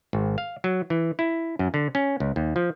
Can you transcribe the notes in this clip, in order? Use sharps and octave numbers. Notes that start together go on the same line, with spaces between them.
G#1
F5
F#3
E3
E4
F#2
D3
C#4
C#2
D#2
F3